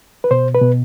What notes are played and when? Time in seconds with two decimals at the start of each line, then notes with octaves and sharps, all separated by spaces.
0.24 B4
0.31 B2 C5
0.55 B4
0.61 B2